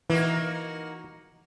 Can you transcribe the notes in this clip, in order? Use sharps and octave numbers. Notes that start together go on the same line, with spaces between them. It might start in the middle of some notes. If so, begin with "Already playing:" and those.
E3 A#3 D#4 F#4